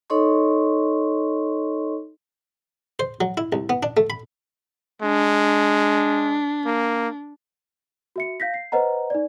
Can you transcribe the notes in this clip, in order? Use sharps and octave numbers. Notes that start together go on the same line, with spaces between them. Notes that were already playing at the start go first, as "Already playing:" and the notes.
D#4 A4 C#5 D#5 C6 C#6
C5
F#3
E4
C2
B3
D4
A3
B5
G#3 D4
A#3
F#4 E5 C#7
F5 G6 A#6 B6
C7
B4 C5 D#5 F#5 A#5
D#4 D5